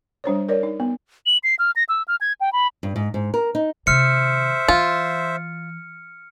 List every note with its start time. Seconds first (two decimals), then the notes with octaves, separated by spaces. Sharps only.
0.24 G3 D4 C5 C#5
0.49 A#4 C#5 D5
0.63 D#4
0.80 B3
1.26 F#7
1.44 C7
1.59 F6
1.76 A#6
1.89 E6
2.08 F6
2.21 G#6
2.41 G5
2.53 B5
2.83 G2
2.96 G#2
3.14 G#2
3.34 A#4
3.55 D#4
3.87 C3 D#3 C5 E5 F6 C#7
4.68 E3 F4